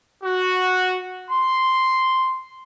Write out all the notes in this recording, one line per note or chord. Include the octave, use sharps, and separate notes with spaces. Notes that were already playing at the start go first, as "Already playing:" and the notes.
F#4
C6